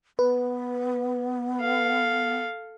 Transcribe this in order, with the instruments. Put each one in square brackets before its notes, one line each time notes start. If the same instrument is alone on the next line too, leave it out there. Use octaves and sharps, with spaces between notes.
[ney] B3 [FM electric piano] B4
[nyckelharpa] A4 F5